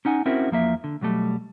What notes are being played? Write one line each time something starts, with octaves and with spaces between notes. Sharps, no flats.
C#4 D#4 F#5 G#5
C4 C#4 E4 F#4 A#4 C5
E2 F3 A#3 E5
D3
B1 F#3 G3 A3